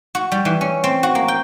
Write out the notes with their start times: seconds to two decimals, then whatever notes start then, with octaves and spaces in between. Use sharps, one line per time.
0.15 F#4
0.32 G3
0.45 E3
0.61 C#4
0.84 C4
1.03 F#4
1.15 A#3
1.28 G5